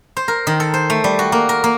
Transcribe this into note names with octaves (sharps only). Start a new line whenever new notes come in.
C5
A#4
D#3
A4
C5
A3
G3
F#4
A#3
A#4
A#3